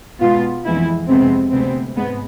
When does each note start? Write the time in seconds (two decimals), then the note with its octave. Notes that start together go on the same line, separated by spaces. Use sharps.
0.21 B2 G#3 B3 F4
0.65 F2 E3 G#3 B3 E4
1.08 F2 C3 G#3 B3 C4
1.52 D2 C3 G#3 B3 C4
1.96 G#2 G#3 B3